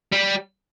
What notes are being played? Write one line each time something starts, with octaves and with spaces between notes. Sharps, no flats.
G3